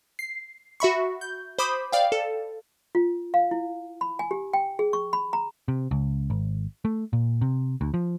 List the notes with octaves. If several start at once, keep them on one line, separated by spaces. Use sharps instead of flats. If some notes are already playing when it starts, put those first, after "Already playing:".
C7
F#4 E5 B5 C#6
G6
C5 B5 D6 D#6 G6
D5 F5 G5
A4
F4
F5
E4
B5
G#5
G4
G5
G#4
C#6
B5
A#5
C3
C#2
G#1
A3
A#2
C3
D2
F3